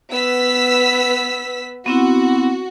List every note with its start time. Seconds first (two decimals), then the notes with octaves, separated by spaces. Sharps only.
0.11 B3 E6 B6
1.86 B3 C4 E4 F#4